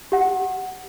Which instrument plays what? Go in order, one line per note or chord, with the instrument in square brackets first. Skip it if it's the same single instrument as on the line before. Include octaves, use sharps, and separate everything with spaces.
[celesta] G4 F#5